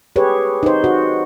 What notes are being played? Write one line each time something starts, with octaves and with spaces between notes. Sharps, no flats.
G4 G#4 B4 C#5
D#4 C5
F#4